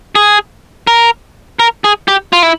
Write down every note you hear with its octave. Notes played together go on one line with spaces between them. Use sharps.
G#4
A#4
A#4
G#4
G4
F4
E4